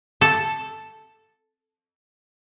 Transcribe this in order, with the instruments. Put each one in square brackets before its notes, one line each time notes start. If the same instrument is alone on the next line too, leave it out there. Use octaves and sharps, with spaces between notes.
[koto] A4